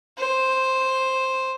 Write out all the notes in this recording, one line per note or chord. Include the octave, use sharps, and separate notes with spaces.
C5